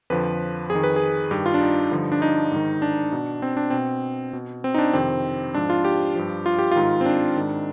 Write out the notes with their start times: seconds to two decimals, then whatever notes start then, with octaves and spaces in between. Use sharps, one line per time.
0.10 F2 D3 F3 B4
0.70 F2 G#4
0.75 D#3
0.83 B4
0.96 G#4
1.31 G2 D#3 G4
1.46 F4
1.54 D4
1.61 D#4
1.91 G2 D3 F3
2.12 D4
2.22 D#4
2.52 G#2 D#3
2.82 D4
3.12 B2
3.42 C4
3.57 D4
3.70 B2 C4
4.33 B2
4.64 C4
4.74 D#4
4.78 D4
4.93 F2 C3 D#3 C4
5.54 G#2 F3 D4
5.70 F4
5.85 G4
6.15 G2 F3
6.46 F4
6.59 G4
6.71 G#2 D#3 F4
7.01 C4
7.06 D4
7.36 G#2 D#3